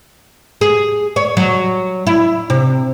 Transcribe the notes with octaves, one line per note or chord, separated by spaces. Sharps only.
G#4
C#5
F#3
E4
C3